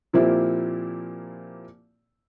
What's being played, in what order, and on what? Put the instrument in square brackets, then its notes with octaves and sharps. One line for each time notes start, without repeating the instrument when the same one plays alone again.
[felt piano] A#2 F3 A#3 C4 E4 G4